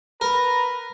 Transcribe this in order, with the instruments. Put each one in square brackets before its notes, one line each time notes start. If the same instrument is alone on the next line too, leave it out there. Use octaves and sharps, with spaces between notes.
[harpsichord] A#4 [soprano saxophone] B4 [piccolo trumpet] A#5